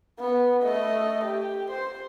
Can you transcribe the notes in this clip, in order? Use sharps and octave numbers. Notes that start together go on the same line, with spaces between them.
B3
A3 D#5
G4
C5